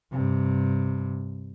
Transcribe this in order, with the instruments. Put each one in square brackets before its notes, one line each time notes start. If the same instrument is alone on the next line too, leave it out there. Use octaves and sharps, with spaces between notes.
[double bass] G2 C3